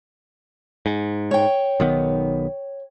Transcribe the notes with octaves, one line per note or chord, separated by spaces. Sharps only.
G#2
C#5 G5
B1 D#3 B3